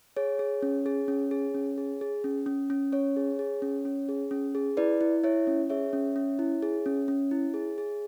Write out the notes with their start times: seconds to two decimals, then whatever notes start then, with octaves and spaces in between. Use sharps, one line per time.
0.16 G#4 C#5
0.39 G#4
0.62 C#4
0.86 G#4
1.08 C#4
1.31 G#4
1.55 C#4
1.78 G#4
2.01 G#4
2.24 C#4
2.46 C#4
2.70 C#4
2.92 C#4 C#5
3.16 G#4
3.39 G#4
3.62 C#4
3.85 C#4
4.09 G#4
4.31 C#4
4.55 G#4
4.77 E4 B4 D5
5.01 E4
5.24 E4 C#5 E5
5.47 C#4
5.70 G#4 C#5 E5
5.93 C#4
6.16 C#4
6.39 E4
6.62 G#4
6.86 C#4
7.08 C#4
7.31 E4
7.54 G#4
7.78 G#4